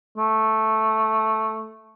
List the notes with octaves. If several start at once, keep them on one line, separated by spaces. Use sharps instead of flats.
A3